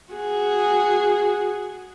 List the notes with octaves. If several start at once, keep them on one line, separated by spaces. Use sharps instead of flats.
F#4 G#4